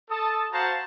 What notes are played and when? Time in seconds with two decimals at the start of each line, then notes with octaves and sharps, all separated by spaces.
0.10 A4 A5 D#6
0.52 F#4 C5 F5 F#5 A5 A#5